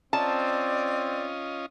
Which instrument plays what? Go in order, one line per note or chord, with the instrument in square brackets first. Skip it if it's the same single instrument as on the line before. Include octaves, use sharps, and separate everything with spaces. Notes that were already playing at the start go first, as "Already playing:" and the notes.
[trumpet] C4 [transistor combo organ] C#4 F4 D#5 [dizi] D5 [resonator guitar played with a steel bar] A5